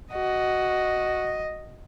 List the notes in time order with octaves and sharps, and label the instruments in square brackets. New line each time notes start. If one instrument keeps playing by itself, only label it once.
[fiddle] F#4 [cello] D#5